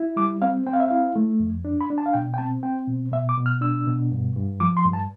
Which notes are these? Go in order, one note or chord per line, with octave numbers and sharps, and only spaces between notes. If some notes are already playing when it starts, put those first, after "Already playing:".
Already playing: E4
G3 D6
C4 F5
C4 G5
F5
E5
E4 F5
A3
F2
D4
B5
D4
A5
F5
B2 G5
G5
C4 A5
C4 G5
B2
B2 E5
D6
B2
F6
D4 E6
B2
G2
G2
F3 D6
C6
G2
A5